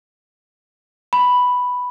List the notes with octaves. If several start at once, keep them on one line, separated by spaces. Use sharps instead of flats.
B5